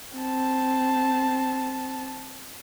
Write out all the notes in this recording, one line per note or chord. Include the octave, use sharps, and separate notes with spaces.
C4 A5